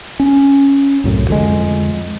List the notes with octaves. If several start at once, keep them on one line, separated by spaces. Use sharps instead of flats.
C#4
C2 F#2 A2
F2 D3 G#3